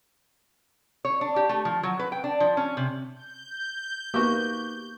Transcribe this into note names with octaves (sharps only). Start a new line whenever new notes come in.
C#5
D4
G4
A3
F3
F#3
B4
G5
D4
F3
C#4
C3
G6
A#3 B3 D#4 F#4 G4